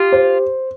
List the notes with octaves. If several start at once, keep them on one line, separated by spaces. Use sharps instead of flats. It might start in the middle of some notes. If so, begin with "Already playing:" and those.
Already playing: F4 G4
C5